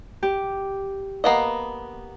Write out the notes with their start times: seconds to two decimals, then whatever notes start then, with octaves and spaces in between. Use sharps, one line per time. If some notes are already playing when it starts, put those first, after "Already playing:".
0.23 G4
1.24 A#3 B3 D#5